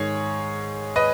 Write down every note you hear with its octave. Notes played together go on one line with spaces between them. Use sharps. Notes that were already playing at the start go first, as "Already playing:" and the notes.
Already playing: G#2 D#3 G#4 C#5
B4 D#5